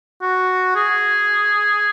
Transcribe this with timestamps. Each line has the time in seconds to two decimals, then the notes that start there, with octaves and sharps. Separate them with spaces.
0.22 F#4
0.76 G#4